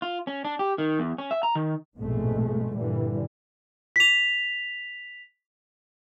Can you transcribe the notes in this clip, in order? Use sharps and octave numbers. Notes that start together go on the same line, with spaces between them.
F4
C#4
D4
G4
D#3
E2
C#4
E5
A#5
D#3
A#1 F2 G#2 B2 G#3 A3
G2 A#2 D3 E3 G3
B6 F7